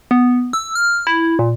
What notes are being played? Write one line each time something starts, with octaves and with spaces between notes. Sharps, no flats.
B3
E6
F6
E4
A#2